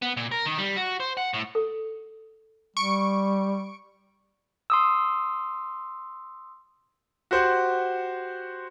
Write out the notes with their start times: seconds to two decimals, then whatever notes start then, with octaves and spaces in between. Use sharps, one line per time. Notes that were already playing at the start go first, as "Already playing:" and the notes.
0.02 B3
0.17 A#2
0.32 A#4
0.46 D#3
0.58 G3
0.77 F#4
1.00 C5
1.17 F#5
1.34 A2
1.55 A4
2.77 G3 C#6 C#7 D7
4.70 C6 D#6 E6
7.31 F#4 G4 C5 F#5